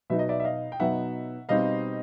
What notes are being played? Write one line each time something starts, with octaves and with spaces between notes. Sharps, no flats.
B2 F#3 B3 D#4 E5
D#5
D5 E5
E5
D#5 F5
G5
B2 F#3 B3 D#4 E5 F#5
B2 G3 C4 D#4 D#5 F5